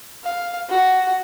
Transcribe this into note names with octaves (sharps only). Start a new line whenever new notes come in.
F5
F#4